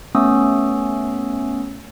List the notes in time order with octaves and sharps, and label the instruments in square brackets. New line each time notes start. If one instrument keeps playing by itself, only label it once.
[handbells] A3 B3 C#4 C#6 D#6 E6